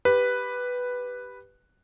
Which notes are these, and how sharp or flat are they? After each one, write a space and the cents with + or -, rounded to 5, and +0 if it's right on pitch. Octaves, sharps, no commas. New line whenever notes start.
G4 +0 B4 +0